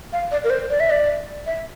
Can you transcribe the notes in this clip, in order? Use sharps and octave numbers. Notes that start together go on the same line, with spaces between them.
F5
D5
A#4
C5
D5
E5
D5
E5